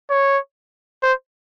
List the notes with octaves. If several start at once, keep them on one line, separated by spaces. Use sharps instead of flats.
C#5
C5